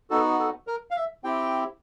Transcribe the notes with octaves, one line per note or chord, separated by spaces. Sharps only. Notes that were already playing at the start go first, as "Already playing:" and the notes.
B3 D#4 F#4 A4
A4
A#4
F5
E5
C4 E4 G4 G5